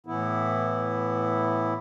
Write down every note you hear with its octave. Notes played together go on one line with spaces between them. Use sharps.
A2 E3 B3 E4